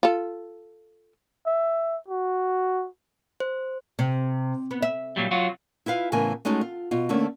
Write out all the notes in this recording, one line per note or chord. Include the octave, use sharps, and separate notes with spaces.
F4 A4
E5
F#4
C5
C3
B3
E5
A#2 F#3 G3
F#3 F4 F#4
E4 F4 B4 F5
A2 C#3 E3 B3 A#4 G#5
G#3 A3 C#4 D#4 F#4 A4
F4
B2 F4
D3 A3 A#3 C4 C#4